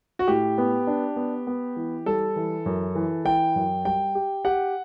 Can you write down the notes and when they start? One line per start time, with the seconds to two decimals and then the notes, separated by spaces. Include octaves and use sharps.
0.19 F#4
0.28 A2 G4
0.58 B3
0.87 D4
1.16 B3
1.47 B3
1.76 E3
2.06 G3 A4
2.36 E3
2.66 F#2
2.95 E3
3.25 E3 G5
3.56 F#2
3.85 G3 G5
4.15 G4
4.45 G4 F#5